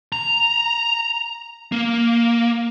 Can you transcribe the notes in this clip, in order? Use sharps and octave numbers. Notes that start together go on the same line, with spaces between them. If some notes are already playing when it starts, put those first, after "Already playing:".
A#5
A#3